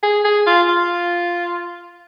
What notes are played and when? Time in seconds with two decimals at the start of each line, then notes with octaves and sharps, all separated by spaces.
0.03 G#4
0.25 G#4
0.47 F4
0.69 F4